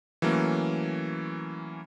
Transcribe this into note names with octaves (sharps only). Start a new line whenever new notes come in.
E3 F#3 A3 A#3 C#4